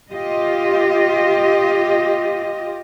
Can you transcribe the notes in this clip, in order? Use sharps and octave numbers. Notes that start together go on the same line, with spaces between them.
F4 G4 D#5